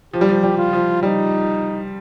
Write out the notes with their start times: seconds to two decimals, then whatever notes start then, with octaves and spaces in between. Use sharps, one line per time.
0.13 F3 G4
0.21 G3
0.29 F3
0.43 G3
0.58 F4
0.73 F3
1.02 G3 D#4